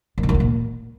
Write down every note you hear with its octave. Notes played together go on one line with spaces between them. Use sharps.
F#2
D3
F#2
G2
A#2